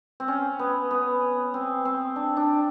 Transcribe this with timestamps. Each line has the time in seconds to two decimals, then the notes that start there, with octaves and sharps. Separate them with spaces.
0.20 C4
0.28 C#4
0.59 B3
0.91 B3
1.54 C4
1.85 C4
2.16 D4
2.37 D4